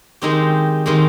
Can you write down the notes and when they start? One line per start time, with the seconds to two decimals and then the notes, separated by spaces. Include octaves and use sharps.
0.22 D#3 G#3 C4 D#4 G4
0.86 D#3 G#3 C4 D#4 G4